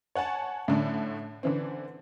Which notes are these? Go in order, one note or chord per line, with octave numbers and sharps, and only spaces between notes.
C#5 F#5 G#5 A5
A2 D3 A3
D3 E3 C4